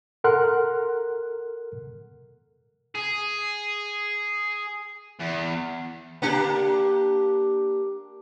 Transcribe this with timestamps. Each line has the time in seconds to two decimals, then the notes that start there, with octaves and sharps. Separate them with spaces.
0.24 A4 A#4 F#5 C6 F6 F#6
2.95 G#4
5.20 E2
6.22 A#3 D4 G4